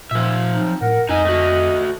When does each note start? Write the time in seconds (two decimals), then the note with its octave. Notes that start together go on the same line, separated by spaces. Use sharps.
0.11 A#2 F3 E5
0.54 F#3 C4 D#4
0.81 A2 A#4 F#5
1.09 F2 D#4 D#5 G#5
1.25 A3 F#4